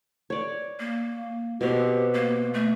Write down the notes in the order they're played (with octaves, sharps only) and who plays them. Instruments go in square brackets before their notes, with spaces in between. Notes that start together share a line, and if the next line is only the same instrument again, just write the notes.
[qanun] C#5 D5
[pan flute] A#3
[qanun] B2 C4 [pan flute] G4
[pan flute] A#3
A3